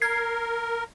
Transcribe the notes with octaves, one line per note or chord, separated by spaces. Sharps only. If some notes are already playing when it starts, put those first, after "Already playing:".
A#4 G#6 C7